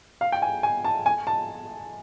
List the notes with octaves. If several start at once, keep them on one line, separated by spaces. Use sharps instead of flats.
F5
G5
G#5
G#5
A5
G#5
A5